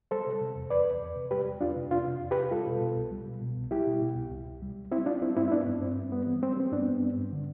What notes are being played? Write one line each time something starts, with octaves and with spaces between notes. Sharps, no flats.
G3 A4 C5
C3
C3
E2
E2 B4 D5
E2
E2
C3
G3 G4 B4
G3
E2 D4 F4
C3
E2 D4 F4
C3
E2
G4 B4
C3
G3 F4 A4
B2
B2
C2
G3
B2
B2
C2
G3 E4 G4
B2
B2
C2
C2
C2
G3
C2
G3 C4 E4
G3 D4 F4
G3 C4 E4
G2 C4 E4
E4
G2 B3 D4
G2
G3 C4
G2
G3 B3
E3
G3 C4
G3 C4
G2 B3 D4
G2
G3
G2
D3